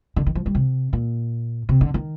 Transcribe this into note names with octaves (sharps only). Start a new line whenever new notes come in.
D3
D#3
F3
G3
C3
A#2
C3
D3
D#3